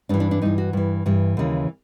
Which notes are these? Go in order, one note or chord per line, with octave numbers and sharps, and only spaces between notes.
G2 E3 D4
D4
D4
G2 E3 D#4
F#4
G2 E3
G2 E3
D#2 C#3 E3